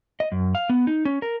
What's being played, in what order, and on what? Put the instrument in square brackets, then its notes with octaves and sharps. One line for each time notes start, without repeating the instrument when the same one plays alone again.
[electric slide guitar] D#5
F#2
F5
B3
D#4
C#4
A#4